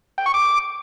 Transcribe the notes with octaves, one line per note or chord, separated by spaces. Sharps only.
G5
C#6
D6